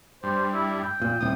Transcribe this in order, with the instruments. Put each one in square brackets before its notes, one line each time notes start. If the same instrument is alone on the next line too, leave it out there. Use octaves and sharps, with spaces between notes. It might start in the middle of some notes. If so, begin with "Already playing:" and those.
[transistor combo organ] G2 [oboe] C5
[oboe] E4
G5
[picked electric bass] F1 A#2
[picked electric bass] D#1 C2 C3 [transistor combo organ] D#6